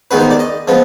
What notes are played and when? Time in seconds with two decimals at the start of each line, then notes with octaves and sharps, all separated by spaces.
0.11 D#2 D#3 G#3 B3 B4
0.20 C5
0.30 D5
0.39 D#5
0.68 F3 G#3 B3